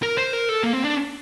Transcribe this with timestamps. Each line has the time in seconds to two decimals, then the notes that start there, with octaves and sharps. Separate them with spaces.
0.02 A#4
0.18 C5
0.33 A#4
0.49 A4
0.63 A#3
0.73 C4
0.84 D4